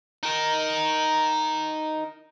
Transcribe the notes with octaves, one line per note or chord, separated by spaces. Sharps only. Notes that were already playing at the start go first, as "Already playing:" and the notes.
D#4 A#4